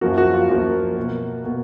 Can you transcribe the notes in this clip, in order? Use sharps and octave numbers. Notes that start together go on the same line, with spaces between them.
F#2 F3 A#3 F#4 A#4
F#4
F4
F#2 F3 A#3 F#4
B2 A#3
B2 A#3